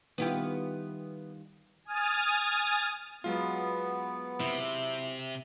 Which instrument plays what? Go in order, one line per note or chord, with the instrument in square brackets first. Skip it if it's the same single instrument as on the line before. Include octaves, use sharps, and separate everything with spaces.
[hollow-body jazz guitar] D#3 G3 F4 [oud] B3 E4 G4
[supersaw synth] G#5 D#6 F6 A6
[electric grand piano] F#3 G#3 F4 [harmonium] B3
[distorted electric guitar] C3 [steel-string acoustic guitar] E4